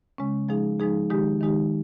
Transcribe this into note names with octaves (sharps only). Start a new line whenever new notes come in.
C#3 G#3 C#4
F3 G#3 D#4 G#4
F3 G#3 D#4 G#4
D#3 G#3 D#4 G4
D#3 G#3 D#4 G4